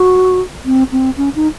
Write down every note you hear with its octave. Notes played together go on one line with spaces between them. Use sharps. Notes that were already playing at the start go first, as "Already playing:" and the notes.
Already playing: F#4
C4
C4
C#4
D#4